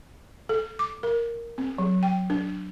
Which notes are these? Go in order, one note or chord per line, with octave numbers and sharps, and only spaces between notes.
A4
D6
A#4
C4
F#3
G5
D4